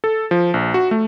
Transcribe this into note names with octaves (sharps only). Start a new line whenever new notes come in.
A4
F3
A#1
F#4
A3